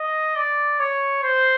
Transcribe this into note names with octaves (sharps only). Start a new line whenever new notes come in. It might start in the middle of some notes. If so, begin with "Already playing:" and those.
Already playing: D#5
D5
C#5
C5